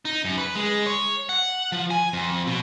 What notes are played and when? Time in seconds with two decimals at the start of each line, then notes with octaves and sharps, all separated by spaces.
0.05 D#4
0.24 F#2
0.38 B4
0.55 G#3
0.86 C#5
1.29 F#5
1.72 F3
1.91 G#5
2.13 F2
2.47 B2